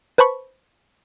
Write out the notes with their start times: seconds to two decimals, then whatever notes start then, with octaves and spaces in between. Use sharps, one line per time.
0.18 B4 C5 A5 B5 C#6